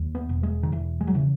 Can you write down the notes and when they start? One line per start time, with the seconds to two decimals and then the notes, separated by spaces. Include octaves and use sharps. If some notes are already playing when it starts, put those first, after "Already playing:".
Already playing: D#2
0.15 B3
0.29 E1
0.43 G#3
0.63 D#3
0.72 E1 E3
1.01 G#3
1.07 F#3
1.14 C#3 E3